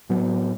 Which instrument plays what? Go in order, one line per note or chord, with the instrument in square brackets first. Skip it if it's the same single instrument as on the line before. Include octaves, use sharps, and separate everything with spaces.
[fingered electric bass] A2 F#3 B3